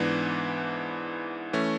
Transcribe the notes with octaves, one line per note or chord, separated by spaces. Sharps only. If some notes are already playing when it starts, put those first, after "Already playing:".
Already playing: G#2 E3 B3 D4
E3 A3 C#4